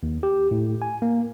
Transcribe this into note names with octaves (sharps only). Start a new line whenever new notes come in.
D#2
G4
A2
G#5
A#3